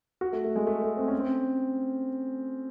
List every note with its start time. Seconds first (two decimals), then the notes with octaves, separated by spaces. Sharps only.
0.21 F#4
0.33 A3
0.44 A3
0.56 G#3
0.67 A3
0.83 A3
0.97 C4
1.08 C#4
1.19 C4